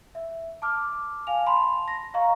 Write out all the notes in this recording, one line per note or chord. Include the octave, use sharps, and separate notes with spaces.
E5
A5 D6 F6
F5 G#5 F7
A5 B5 C6 F7
A#6
D#5 F5 A#5 C#6